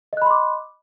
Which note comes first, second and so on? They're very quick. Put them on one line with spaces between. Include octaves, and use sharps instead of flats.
D#5 F#6 B5 C6 D6